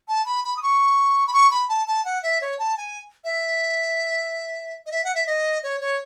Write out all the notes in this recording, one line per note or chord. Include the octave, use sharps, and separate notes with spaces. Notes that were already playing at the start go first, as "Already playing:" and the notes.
A5
B5
B5
D#6
C#6
B5
C#6
B5
A5
A5
F#5
E5
C#5
A5
G#5
E5
D#5
E5
F#5
E5
D#5
C#5
C#5